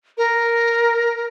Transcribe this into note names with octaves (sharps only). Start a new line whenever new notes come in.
A#4